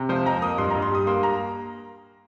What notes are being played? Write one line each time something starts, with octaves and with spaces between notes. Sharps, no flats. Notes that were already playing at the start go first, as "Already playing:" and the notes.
Already playing: C3
F3 C5
F2 A#5
A#3 D#6
G2 C6
G2 A#5
C6
G3 D#6
A#3 C6
A#5